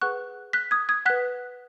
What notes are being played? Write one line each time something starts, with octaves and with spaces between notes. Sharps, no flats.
G#4 B4 F#5 C#6 F#6
F#6 B6
D#6 G#6
D#6 G#6
B4 F#5 F#6 B6